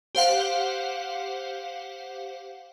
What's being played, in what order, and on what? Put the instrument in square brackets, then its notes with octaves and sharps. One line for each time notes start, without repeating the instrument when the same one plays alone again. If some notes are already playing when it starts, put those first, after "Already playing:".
[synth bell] G4 C5 F5 F#5